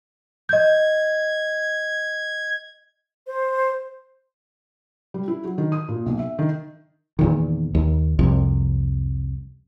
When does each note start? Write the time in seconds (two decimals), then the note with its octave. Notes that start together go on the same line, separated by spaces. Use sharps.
0.49 D#5 G6 G#6
3.27 C5
5.14 G3
5.28 E4
5.44 F#3
5.58 D#3
5.72 D#6
5.88 A#2
6.06 B1
6.19 E5
6.39 D#3
7.19 E2 A#2 D#3
7.75 D#2
8.19 C2 F2 C3